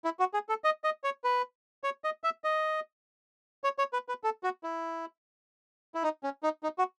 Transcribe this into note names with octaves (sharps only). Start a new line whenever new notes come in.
E4
F#4
G#4
A4
D#5
D#5
C#5
B4
C#5
D#5
E5
D#5
C#5
C#5
B4
B4
A4
F#4
E4
E4
D#4
C#4
D#4
D#4
F#4